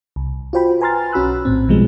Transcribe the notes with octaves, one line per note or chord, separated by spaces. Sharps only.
C2
F4 F#4 C5 G5 B5
B4 G#5 A#5 C6 F6 A6
B1 C#4 F#4 B5 E6 F#6
A#1 A2 C4
B1 B2 F3 G3 G#3 B3